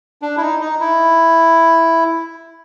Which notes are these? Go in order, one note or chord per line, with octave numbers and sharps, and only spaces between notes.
D4
E4
D#4
D#4
E4